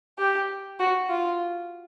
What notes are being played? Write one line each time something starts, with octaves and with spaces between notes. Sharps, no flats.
G4
F#4
F4